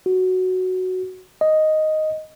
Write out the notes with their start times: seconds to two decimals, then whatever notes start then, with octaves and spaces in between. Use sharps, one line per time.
0.06 F#4
1.41 D#5